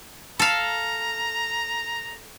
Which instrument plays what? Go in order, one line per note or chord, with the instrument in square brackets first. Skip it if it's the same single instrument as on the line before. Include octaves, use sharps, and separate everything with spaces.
[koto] A4 F5 [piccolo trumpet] A#5